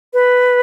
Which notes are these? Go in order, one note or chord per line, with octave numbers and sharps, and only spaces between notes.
B4